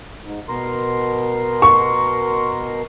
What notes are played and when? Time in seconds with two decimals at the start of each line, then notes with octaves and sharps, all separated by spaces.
0.24 G#2
0.49 B2 A#4 C6
1.62 C#6